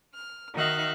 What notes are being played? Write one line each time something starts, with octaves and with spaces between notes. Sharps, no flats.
F6
D#3 D#4 F#4 E5 F5 F#6